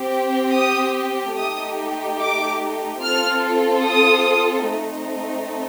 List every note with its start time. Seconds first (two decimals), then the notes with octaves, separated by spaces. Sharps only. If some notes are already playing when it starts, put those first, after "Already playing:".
Already playing: C4 G4
0.54 D#6
1.37 A3 D#4 G4 D#6
2.20 D6
3.03 C4 F4 A4 F6
3.85 D#6
4.69 A3 C4 D#4